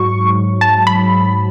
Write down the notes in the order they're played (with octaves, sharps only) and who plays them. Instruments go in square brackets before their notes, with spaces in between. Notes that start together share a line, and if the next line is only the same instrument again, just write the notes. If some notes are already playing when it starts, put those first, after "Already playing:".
Already playing: [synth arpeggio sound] G#2 F#3 C#6
A5
B5